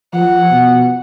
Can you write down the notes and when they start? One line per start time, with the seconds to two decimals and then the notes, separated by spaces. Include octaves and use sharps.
0.13 F3 F#5
0.51 B2